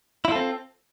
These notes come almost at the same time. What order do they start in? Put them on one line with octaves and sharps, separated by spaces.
E4 F4 A4 C4